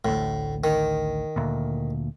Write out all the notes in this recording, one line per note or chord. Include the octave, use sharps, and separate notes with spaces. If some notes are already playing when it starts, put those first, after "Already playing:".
A1 D2 A2
D#3
D2 A#2